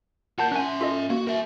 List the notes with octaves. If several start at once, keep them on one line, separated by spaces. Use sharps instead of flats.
F4 A#4 F#5 A5 G6
C#4 E5 G#5 F#6
F4 A4 D#5
A#3 F#4
A#4 E5